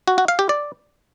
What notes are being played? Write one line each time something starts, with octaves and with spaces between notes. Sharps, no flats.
F#4
F#4
F5
G4
D5